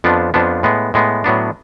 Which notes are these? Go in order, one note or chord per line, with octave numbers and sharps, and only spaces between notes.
F2 F3 B3 D4
F2 F3 B3 D4
A2 G#3 B3
A2 G#3 B3
A2 F#3 B3 D4